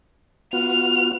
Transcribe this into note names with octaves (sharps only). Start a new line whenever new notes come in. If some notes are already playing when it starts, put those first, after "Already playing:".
B3 F4 F#4 F7